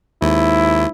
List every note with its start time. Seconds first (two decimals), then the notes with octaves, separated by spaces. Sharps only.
0.22 D#2 G#2 E4